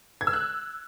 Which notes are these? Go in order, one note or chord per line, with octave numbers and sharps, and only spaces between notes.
G#6
E6
F#6